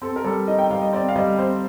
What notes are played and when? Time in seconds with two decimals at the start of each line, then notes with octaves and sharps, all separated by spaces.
0.02 C4 A4
0.16 A#4
0.24 G3 A4
0.48 D#4 D#5
0.58 G5
0.70 G3 F5
0.82 D#5
0.93 C4 D5
1.09 F5
1.16 G3 D#5
1.38 C4 C5